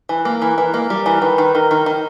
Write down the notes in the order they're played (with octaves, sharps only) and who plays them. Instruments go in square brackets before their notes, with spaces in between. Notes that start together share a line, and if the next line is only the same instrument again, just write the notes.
[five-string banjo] E3
[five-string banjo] A#3 [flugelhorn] A#4
[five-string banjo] E3
E3
A#3
G3
E3
[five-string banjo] D#3 [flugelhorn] B4
[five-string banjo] D#3
[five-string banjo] D#3 [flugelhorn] A#4
[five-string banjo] D#3
D#3